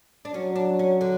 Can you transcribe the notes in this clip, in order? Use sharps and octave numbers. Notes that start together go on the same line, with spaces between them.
D4
F#3 C#4
D4
C#4
D3